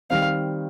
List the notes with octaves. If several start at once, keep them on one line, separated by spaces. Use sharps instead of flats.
D#3 G3 C4 F5